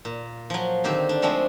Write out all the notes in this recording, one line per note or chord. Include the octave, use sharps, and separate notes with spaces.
A#2
F3 F#3
D3 D#3 C4 G4
D4
F3 G#3 A3 C4 D4